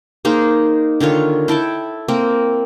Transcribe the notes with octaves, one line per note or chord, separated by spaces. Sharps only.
A#3 D#4 G#4 C5
D3 D#3 F4 C#5
E4 A4 G5 A5
A#3 C4